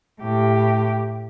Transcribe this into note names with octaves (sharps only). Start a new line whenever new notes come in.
A2 G4